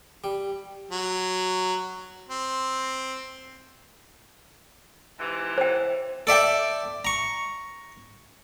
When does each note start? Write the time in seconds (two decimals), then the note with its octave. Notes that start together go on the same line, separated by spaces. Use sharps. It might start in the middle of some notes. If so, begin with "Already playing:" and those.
0.24 G3
0.91 F#3
2.29 C4
5.19 G#2 C3 E3
5.58 C5 G5
6.27 A4 D5 E5 G5
7.05 A#5 C#6